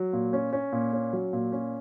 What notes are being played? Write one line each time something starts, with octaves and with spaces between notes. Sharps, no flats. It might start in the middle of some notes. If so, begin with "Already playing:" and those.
Already playing: F#3
A#2
C#4
C#4
A#2
C#4
F#3
A#2
C#4